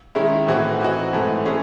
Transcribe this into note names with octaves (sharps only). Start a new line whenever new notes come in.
D#3 G#3 C#4 E4
A2 E3 C4 F#4
E3 C4 D#4 F#4
G#2 E3 A3
E3 G#3 C#4 G#4